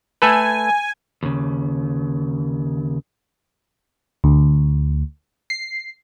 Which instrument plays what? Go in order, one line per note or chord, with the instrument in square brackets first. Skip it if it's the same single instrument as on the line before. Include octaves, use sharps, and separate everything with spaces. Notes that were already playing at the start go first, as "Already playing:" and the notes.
[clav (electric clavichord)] A3 A4 B4 [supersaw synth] G#5
[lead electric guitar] D#2 C#3
[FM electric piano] D2
C7